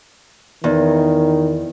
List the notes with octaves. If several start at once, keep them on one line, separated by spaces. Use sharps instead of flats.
E2 D#3